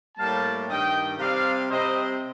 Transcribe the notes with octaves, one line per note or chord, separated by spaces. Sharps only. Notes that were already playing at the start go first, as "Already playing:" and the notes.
A2 G3 A#3 F5 A5
G2 D#3 G3 D#5 G5
C3 G3 C4 D5 F5
C3 G3 C4 C5 D#5